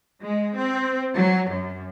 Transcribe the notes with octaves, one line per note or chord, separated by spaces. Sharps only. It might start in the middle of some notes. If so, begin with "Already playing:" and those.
G#3
C4
F#3
F#2